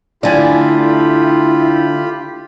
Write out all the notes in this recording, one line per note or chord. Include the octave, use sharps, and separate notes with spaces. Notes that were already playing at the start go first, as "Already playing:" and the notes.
D3 A3 E4 F4 G4 D5 G#5 B5